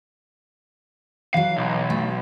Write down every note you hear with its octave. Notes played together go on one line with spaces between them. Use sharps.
E3 F#3 F5
B1
A3